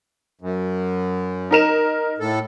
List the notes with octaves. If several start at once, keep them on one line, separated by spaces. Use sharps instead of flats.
F#2
D#4 A#4 E7
A2 A4